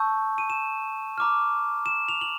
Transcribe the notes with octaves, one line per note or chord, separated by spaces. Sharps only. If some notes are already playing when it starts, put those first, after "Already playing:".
Already playing: A5 C#6 E6 G6
D#7
E7
A#5 D6 F6
E7
F7
F#7